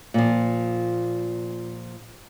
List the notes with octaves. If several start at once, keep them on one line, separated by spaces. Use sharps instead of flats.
A#2 F3